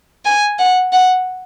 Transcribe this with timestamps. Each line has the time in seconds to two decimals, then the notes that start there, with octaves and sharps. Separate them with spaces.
0.25 G#5
0.59 F#5
0.93 F#5